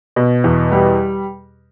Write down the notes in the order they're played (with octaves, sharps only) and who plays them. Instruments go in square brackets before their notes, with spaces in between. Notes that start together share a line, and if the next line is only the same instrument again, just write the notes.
[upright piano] B2
E2
G3